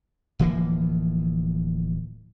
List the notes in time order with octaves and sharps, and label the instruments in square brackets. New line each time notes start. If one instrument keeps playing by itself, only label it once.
[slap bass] D1 E3 F3 A#3